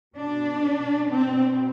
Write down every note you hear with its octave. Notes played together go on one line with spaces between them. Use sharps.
B2 D4
B2 C4